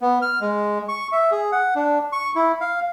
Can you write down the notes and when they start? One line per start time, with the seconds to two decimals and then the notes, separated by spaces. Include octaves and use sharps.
0.01 B3
0.22 F6
0.41 G#3
0.88 C#6
1.12 E5
1.31 G#4
1.52 F#5
1.75 D4
2.12 C#6
2.36 E4
2.61 F5